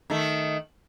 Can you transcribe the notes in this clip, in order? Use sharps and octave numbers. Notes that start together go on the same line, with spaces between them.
D#3 A3